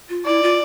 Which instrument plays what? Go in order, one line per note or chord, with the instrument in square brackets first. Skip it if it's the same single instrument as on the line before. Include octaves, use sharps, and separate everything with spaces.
[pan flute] F4
[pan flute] E4 [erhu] D5
[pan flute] F4